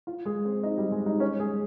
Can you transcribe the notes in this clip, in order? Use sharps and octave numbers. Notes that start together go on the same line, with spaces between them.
F4
G#3 G#4
C4 C5
D#4 D#5
G3 G4
G#3 G#4
D#4 D#5
C#4 C#5
G#3 G#4